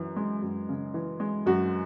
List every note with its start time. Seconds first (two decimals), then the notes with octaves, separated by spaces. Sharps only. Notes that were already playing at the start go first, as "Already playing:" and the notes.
Already playing: F#2 E3
0.16 G#3
0.42 F#2
0.69 C#3
0.94 E3
1.20 G#3
1.46 F#2 F#4